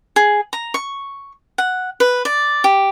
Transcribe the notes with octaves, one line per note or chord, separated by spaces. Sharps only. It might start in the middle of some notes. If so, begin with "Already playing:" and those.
G#4
A#5
C#6
F#5
B4
D5
G4